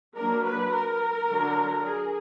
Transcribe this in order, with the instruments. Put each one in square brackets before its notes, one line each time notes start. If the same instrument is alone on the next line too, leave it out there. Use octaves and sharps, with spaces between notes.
[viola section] F#3 A#3 D4 A#4
B4
A#4
D3 F#3 D4
G#4